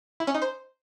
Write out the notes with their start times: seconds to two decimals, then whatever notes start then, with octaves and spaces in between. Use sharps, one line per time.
0.20 E4
0.27 C#4
0.34 D#4
0.42 C5